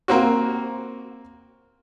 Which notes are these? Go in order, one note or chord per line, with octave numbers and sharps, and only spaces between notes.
A#3 C4 F#4